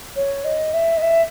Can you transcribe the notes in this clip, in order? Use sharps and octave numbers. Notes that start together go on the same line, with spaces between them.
C#5
D#5
E5
D#5
E5